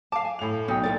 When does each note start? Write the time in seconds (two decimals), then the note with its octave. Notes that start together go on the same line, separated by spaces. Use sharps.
0.12 F5 A5 D6
0.25 G#5
0.39 A2 F7
0.68 B1 B2 D#4 G5
0.83 A#2 E4 A#4 D5 A6